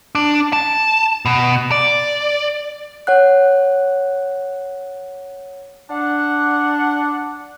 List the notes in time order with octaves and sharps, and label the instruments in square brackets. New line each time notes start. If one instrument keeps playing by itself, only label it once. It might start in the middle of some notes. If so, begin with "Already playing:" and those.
[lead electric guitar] D4
A5
B2
D5
[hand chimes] C#5 F#5 F#6
[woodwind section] D4 F#5